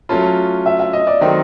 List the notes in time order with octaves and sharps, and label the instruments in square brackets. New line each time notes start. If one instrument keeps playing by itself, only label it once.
[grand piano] F#3 A3 C#4 F4 [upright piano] A5
[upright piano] E5
E5
D#5
D5
[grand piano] D#3 F#3 A3 C4 D#4